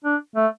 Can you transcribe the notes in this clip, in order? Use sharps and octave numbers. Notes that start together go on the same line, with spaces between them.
D4
A3